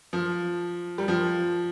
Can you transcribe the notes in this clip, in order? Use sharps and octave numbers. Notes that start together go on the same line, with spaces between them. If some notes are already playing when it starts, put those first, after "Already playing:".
F3
G3
F3